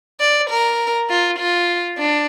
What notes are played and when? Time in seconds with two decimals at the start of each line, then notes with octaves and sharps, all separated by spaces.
0.20 D5
0.50 A#4
1.10 F4
1.38 F4
1.98 D4